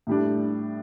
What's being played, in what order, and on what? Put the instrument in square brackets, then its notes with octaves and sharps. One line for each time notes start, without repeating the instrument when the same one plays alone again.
[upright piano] A2 G3 D4